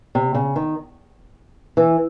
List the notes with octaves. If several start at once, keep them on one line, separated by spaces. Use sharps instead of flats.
C3
C#3
D#3
E3